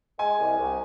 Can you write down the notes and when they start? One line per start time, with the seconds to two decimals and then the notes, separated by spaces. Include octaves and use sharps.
0.19 G#3 G#5
0.39 C2
0.59 C2